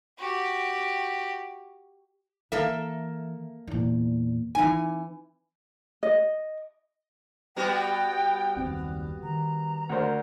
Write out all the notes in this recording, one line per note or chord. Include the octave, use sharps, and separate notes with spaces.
F#4 G4
E3 A#3 A4 E5
E2 A#2
E3 C4 D#4 G#5
D#5
G3 B3 F#4 G5
F#1 D#2 C4
D#3 A#5
D2 A#4 C5